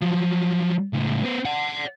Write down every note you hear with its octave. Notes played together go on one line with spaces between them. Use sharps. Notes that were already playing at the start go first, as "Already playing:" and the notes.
F3 F#3
C#2 A2
B3 C5
D5 F#5